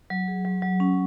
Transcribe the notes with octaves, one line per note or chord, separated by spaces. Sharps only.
F#3
G#4
F#3
F#3
C#4